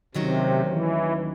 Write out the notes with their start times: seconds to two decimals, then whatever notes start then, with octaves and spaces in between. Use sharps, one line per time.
0.14 D#2 C3 D#3 F#3 A3 C#4
0.67 E3